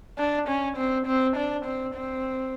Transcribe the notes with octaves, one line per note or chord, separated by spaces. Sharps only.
D4
C#4
C4
C4
D4
C4
C4